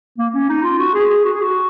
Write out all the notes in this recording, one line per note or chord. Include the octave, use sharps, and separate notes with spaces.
A#3
C#4
D#4
F4
F#4
G#4
G#4
F#4
G#4
F#4